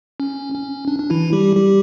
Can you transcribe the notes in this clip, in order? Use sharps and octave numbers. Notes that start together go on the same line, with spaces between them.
C#4
C#4
D4
D4
E3 E4
G3 G4
G3 G4